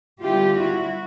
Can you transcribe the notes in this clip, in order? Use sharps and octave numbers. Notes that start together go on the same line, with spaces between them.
D3 G3 B3 E4 F4 G4
E4 F#4